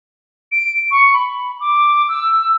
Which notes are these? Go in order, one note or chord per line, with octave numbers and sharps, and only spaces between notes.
D7
C#6
B5
D6
E6